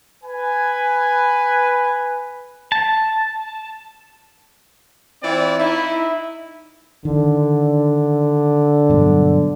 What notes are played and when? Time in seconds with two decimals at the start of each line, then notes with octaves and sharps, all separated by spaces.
0.23 B4 G#5
2.72 A5
5.23 E3 C4 E4 F4 D5
5.59 D#4 E4
7.05 D3 D#3
8.90 G2 B2 F#3